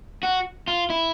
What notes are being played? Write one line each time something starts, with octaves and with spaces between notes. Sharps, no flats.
F#4
F4
E4